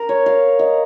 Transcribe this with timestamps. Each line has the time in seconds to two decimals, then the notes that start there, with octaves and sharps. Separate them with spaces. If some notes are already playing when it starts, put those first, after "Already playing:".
Already playing: A#4
0.09 C#5
0.26 F5
0.59 D#5